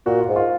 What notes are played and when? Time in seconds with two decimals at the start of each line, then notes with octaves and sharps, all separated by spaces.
0.06 A#2 F#4
0.21 F4
0.29 G#2
0.36 F4